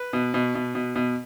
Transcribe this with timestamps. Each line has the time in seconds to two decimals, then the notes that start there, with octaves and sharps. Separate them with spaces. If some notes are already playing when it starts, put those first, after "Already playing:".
Already playing: B4
0.13 B2
0.34 B2
0.55 B2
0.75 B2
0.96 B2